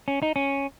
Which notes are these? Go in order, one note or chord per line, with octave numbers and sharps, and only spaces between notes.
C#4
D#4
C#4